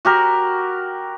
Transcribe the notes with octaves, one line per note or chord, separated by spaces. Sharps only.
F#4 G4 A#4